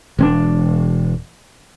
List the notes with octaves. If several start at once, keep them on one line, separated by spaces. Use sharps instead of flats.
E1 C4 D4